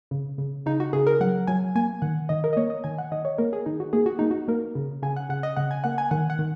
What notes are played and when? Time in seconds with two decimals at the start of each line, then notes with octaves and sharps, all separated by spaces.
0.11 C#3
0.38 C#3
0.66 C#3 D#4
0.80 F#4
0.93 C#3 G#4
1.07 A#4
1.21 F#3 F#5
1.47 F#3 G#5
1.75 A#3 G#5
2.02 D#3 F#5
2.29 D#3 D#5
2.44 A#4
2.53 D#5
2.57 A#3 C#5
2.70 D#5
2.84 D#3 G#5
2.98 F#5
3.12 D#3 D#5
3.25 C#5
3.38 A#3 A#4
3.53 G#4
3.66 D#3 D#4
3.80 F#4
3.93 A#3 G#4
4.06 F#4
4.19 A#3 D#4
4.31 F#4
4.48 A#3 A#4
4.75 C#3
5.03 C#3 G#5
5.16 F#5
5.29 C#3 F#5
5.43 D#5
5.56 C#3 F#5
5.71 G#5
5.84 A#3 F#5
5.98 G#5
6.11 D#3 F#5
6.30 F#5
6.39 D#3